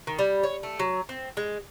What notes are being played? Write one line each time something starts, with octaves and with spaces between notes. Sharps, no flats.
D#3
G3
C#5
A3
F#3
C4
G#3